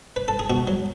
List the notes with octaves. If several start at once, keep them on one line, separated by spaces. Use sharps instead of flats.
B4
A4
G#4
B2 F#4
F#3